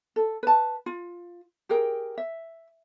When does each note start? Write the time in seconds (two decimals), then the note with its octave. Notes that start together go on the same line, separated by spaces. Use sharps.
0.16 A4
0.43 B4 A5
0.86 F4
1.69 G4 G#4 A#4 G5
2.18 E5